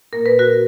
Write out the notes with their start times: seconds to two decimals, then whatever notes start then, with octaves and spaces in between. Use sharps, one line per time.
0.13 A#2 A#3 A#4
0.26 B4
0.39 F#4 A#4